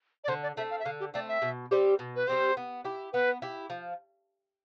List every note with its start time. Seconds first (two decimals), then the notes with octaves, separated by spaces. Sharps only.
0.24 D5
0.28 D3 C5
0.43 D5
0.57 A3 C4 E5
0.71 F5
0.80 E5
0.85 D3 F5
1.00 G4
1.14 A3 C4 D5
1.28 E5
1.42 B2
1.71 G3 C4 G4
1.99 B2
2.16 B4
2.27 G3 C4 G4 C5
2.57 B3
2.85 E4 G4
3.13 B3 B4
3.42 E4 G4
3.70 F3